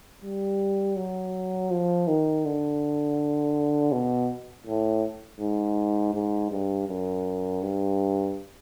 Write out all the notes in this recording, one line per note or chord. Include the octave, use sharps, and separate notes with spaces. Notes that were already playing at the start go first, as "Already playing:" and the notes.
G3
F#3
F3
D#3
D3
B2
A2
G#2
G#2
G2
F#2
G2